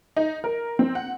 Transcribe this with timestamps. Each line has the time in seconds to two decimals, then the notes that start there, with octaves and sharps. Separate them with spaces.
0.17 D#4
0.44 A#4
0.79 C4
0.95 F#5